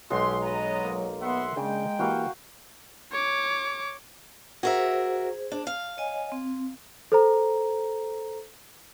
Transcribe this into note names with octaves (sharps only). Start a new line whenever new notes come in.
B1 G#3 A3 F#4 G4 C6
F#3 B3 D#5 A#5
A#3
B3 E5 F#5 C6
C#3 G#3 D4 G#4 G5
E3 A#3 F#4 G4 F5
C#5 D6
F#4 G#4 A#4 C5 E5
D4
F5
C#5 D#5 G#5
C4
A4 C5 A#5